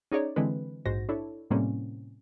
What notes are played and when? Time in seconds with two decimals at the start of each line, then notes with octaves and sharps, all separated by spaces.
0.12 C#4 D#4 G#4 C#5 D5
0.36 D3 E3 G#3 C4 B4
0.86 A#1 G#2 F#4 C5 A#6
1.09 D4 E4 A4 C#5
1.50 A2 C3 G3 A#3 C4 C#4